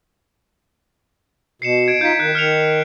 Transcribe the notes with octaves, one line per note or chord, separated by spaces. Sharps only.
B2 C7 C#7 E7
G#6 D7
D#4 F4 G6 B6
D#3 F#6
D#3 F6 C#7 F7